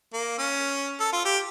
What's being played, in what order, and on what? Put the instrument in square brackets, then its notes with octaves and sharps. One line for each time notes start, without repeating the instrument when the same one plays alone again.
[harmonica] A#3
C#4
A4
F4
G4